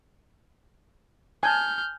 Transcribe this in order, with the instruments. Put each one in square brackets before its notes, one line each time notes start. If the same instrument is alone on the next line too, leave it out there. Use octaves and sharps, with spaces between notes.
[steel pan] G#5 A5 [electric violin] F6 G6